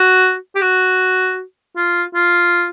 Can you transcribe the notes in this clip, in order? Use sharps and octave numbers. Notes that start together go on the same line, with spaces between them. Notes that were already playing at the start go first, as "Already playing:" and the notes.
Already playing: F#4
G4
F#4
F4
F4